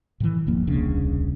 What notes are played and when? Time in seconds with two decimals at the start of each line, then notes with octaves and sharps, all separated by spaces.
0.20 A2 D#3 E3
0.47 D#1 G2 F3 A#3
0.67 D#1 C2 C#3 D4